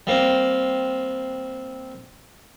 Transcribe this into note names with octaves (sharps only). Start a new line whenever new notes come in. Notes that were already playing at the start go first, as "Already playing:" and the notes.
G3 A#3 C4